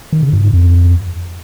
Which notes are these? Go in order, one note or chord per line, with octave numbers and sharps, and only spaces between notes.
D#3
C#3
G2
G#2
F2